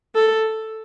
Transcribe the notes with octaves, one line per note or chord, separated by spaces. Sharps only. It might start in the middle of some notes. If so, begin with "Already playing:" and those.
A4